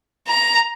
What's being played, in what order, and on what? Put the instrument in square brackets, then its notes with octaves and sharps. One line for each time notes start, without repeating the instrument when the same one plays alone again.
[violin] A#5